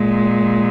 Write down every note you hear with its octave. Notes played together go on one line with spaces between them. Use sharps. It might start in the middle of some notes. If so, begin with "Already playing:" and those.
Already playing: A#2 G#3